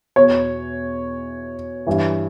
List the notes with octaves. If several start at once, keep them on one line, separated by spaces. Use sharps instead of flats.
E2 B2 C#5
G2 E3